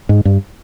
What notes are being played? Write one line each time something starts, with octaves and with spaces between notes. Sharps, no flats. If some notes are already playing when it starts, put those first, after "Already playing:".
G#2
G2